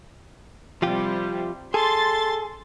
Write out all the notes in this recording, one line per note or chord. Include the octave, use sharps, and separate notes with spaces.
C3 F3 G3 F4 G4
G#4 A4 C6 A6